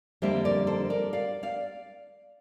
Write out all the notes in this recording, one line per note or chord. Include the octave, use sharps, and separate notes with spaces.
F2 D3 G3 A#3 C5 E5
A#4 D5
A4 C5
A#4 D5
D5 F5
D5 F5